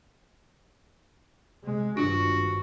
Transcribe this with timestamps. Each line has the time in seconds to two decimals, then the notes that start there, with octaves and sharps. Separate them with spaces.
1.64 C3 G#3
1.97 G#1 G2 D4 F4 F#4